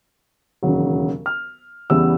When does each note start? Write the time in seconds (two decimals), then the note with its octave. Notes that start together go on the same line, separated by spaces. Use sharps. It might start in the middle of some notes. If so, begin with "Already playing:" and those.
0.63 E1 D#2 C#3 F#3
1.26 F6
1.90 E2 C#3 E3 G3 B3 E6